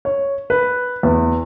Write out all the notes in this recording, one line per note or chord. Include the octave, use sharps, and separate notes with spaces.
C#5
B4
E2